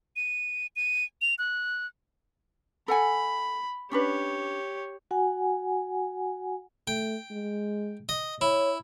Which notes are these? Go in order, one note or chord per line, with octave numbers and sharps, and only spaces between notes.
D#7
D#7
F7
F#6
A4 F#5 G#5 B5
C#4 D4 G4 B4 C#5
F#4 F#5 G#5
A3 G5
G#3
D#5
E4 C#5